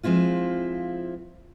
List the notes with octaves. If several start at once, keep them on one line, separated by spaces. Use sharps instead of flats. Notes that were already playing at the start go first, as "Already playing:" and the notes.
F3 G#3 C4 E4 F4